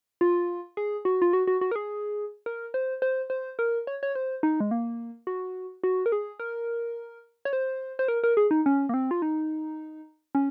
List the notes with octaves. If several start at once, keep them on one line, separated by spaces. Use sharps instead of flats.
F4
G#4
F#4
F4
F#4
F#4
F#4
A#4
G#4
A#4
C5
C5
C5
A#4
C#5
C#5
C5
D#4
G#3
A#3
F#4
F#4
A#4
G#4
A#4
C#5
C5
C5
A#4
A#4
G#4
D#4
C#4
A#3
C4
F4
D#4
C#4